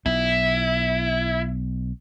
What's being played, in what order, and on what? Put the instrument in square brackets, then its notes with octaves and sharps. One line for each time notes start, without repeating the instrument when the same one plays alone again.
[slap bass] B1 B3 [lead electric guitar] E4